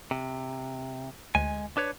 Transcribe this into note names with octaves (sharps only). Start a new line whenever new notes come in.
C3
D2 G#3 G#5
D4 B4 C#5